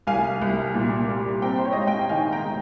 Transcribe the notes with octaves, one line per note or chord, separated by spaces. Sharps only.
C2 F5 G#5
C2
A#2
G3
C4 G5 A#5
C5
C#5
D#5
G#2 F5
D#5 G5
D#3 F5 G#5
G5 A#5
G#3